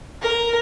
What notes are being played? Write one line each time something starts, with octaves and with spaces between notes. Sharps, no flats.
A#4